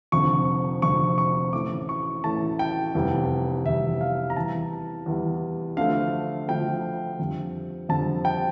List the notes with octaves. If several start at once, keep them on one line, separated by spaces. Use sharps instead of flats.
F1 F2 D3 C#6
F1 F2 D3 C#6
C#6
A1 A2 E3 A3 D6
C#6
A1 A2 E3 A3 A5
G5
F1 E2 E3 G3
F1 E2 E3 G3 E5
F5
A#5
E2 E3 G3 A5
E2 E3 G3
D2 D3 F3 A3 F5
D2 D3 F3 A3 G5
F2 D3 G3
F2 D3 G3 A5
G5